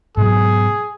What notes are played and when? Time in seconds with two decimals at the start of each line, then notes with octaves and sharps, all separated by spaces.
0.17 G#2 B2 F#3 G#4